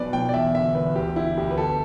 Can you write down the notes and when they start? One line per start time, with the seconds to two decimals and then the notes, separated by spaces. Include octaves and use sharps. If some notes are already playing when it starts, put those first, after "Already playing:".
Already playing: B1 B2 B4 D5
0.13 B1 G5
0.29 D5
0.34 E2 E5
0.55 D3 E5
0.75 E2 B4
0.96 D2 G4
1.16 D3 E4
1.37 D2 G4
1.51 B4
1.57 G1 A4